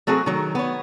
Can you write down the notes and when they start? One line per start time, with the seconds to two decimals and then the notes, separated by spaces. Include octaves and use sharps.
0.07 F#3 A3 C4 F#4 G#4
0.26 D#3 F#3
0.55 B3 C#5